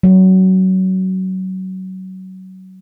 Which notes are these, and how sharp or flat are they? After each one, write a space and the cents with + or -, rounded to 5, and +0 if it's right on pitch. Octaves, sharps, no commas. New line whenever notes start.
F#3 +20